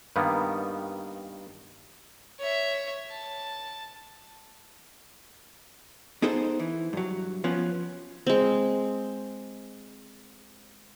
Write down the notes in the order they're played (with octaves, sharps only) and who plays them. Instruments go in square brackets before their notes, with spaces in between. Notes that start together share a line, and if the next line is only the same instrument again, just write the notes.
[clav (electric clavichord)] G2 D#3 G3 A#3 B3
[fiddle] C#5 E5
A5
[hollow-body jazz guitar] B3 D#4 G#4 A4 C5
E3
G2 F#3
F3 B3 C#4
[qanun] G#3 C4